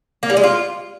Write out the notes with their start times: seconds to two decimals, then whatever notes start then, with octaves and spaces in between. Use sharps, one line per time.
0.23 A#3
0.30 G3
0.37 G#3
0.43 F4